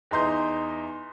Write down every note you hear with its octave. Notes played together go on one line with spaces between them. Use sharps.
E2 D#4 A#5 C6 D#6 G6